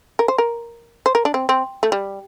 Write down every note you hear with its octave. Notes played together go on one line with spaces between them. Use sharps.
A#4
C5
A#4
C5
A#4
D4
C4
C4
A3
G3